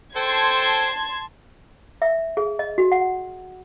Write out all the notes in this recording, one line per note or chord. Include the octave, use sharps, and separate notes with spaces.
A4 C5 G5 A5 C6 G#6
E5
G#4
D#5
F#4
F#5